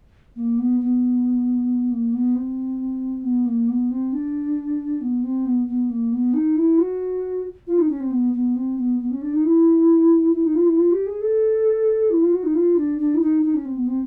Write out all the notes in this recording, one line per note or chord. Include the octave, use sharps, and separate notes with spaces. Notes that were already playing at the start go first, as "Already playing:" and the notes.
A#3
B3
B3
A#3
B3
C4
B3
A#3
B3
C4
D4
B3
C4
B3
B3
A#3
B3
D#4
E4
F#4
F4
D#4
C#4
C4
B3
B3
C4
B3
B3
C#4
D4
D#4
E4
E4
D#4
F4
E4
F4
G4
G#4
A4
E4
F4
F#4
D#4
F4
D4
D4
E4
D#4
D#4
C#4
C4
B3
C4